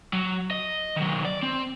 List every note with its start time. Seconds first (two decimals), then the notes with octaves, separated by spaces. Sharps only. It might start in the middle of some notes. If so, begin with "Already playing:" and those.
0.13 F#3
0.51 D#5
0.96 D#3 F#3
1.25 D5
1.43 C4